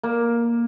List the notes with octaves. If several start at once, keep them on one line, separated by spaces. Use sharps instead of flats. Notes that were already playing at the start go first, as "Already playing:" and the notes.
A#3